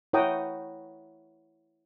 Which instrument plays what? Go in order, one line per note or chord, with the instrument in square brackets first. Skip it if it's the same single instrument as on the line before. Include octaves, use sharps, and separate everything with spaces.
[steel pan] E4 C#5 F#5 G5 A#5 D#6